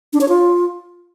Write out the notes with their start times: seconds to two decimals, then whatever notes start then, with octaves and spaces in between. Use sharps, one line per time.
0.13 D4
0.21 C#5
0.28 F4